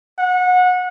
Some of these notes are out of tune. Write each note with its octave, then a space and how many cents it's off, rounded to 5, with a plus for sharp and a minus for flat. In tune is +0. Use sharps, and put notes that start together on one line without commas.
F#5 -25